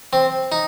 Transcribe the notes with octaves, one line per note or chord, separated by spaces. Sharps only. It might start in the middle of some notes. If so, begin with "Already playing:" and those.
C4
D#4